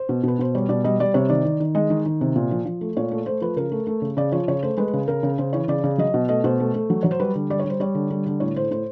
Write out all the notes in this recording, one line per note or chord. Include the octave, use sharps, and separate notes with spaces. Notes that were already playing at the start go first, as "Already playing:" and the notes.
Already playing: C5
B2
B2 B4
B2 C5
G3 C#5
B2 D5
G3 D#5
G3 D5
C3 C#5
D#3 D5
D#3
D#3
G#3 D#5
D#3
D#3
C3
A#2
F3
F3
A3
A#2 C#5
A3
A3 C5
F3 B4
C#3 A#4
A3
A3
C#3
C#3 D5
F3 C#5
C#3 C#5
A3 C5
G#3 B4
C#3
C#3 A#4
C#3
C#3 C5
E3 C#5
C#3 D5
C#3
F#3 D#5
B2
A3 D#5
B2 C5
A3
A3
F#3
F#3 C#5
C5
G3 B4
D3
G3 D5
C#5
G3
C5
G3 C#5
D3
G3
D3
A2 C#5
A2 C5
A2 C5